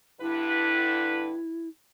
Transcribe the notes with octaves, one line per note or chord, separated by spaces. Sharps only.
G2 D3 E4 B4